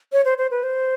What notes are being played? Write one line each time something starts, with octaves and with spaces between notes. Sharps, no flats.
C#5
C5
C5
B4
C5